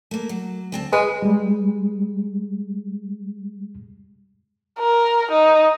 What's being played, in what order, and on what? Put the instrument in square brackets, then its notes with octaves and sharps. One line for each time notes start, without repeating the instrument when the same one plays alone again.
[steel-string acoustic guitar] A3 A#3
F#3
D2 C4 A5
[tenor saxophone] G#3 [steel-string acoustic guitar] G#4 [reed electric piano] B4
[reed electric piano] G3 G#3
[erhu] A#4
D#4